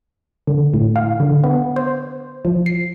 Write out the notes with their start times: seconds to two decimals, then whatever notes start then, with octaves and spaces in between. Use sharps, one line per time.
0.47 D3
0.74 A2
0.96 F5
1.20 D3
1.44 B3
1.76 C5
2.45 F3
2.66 C7